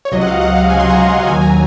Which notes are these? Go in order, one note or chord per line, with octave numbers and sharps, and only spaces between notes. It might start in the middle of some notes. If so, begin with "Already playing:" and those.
C#5
C#2 C3 F#3 D#5
F#5
F5
F#5
F5
G#5
C6
A#5
C6
D#2 D#3 F#3 G#5
A#5